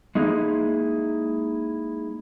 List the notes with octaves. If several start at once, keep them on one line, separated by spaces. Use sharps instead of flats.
G#3 A#3 D#4 E4 G#4